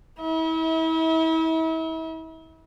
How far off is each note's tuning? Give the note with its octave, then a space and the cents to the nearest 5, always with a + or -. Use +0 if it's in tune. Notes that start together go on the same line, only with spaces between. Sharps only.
E4 -35 E5 -40